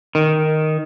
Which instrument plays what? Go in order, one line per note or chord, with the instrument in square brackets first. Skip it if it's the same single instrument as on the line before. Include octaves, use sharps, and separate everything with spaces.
[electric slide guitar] D#3